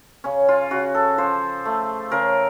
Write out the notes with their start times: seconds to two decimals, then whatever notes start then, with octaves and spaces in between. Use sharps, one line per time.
0.24 C#3 C#4
0.49 F4
0.71 C#3 F#4
0.94 A4
1.18 F3 C5
1.65 A3
2.11 C#3 A#4